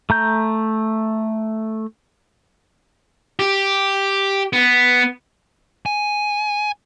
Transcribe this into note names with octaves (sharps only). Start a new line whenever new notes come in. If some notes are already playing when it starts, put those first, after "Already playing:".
A3 A#5 G6
G4
B3
G#5